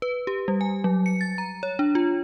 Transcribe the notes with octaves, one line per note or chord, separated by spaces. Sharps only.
B4
G4
G3
G#5
F#3
C#7
A6
A#5
C#5
D4
F4